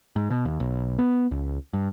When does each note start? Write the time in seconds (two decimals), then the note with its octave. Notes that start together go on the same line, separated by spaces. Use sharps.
0.16 G#2
0.30 B2
0.45 D#2
0.60 B1
0.98 B3
1.31 C#2
1.73 G2